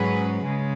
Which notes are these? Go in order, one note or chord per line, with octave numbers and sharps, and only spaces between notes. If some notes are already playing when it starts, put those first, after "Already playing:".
Already playing: G#2 F#3 C#4 G#4 B4
C#3 G#3